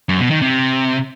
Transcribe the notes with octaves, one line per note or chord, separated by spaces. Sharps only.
F#2
B2
D#3
C3